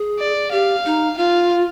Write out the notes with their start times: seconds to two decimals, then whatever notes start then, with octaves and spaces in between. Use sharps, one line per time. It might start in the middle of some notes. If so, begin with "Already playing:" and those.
Already playing: G#4
0.19 D5
0.52 G4 F5
0.85 D#4
1.17 F4 F5